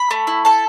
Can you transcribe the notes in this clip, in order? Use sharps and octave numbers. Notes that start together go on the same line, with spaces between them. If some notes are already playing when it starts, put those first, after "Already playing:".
Already playing: B5
A3
E4
A4 A5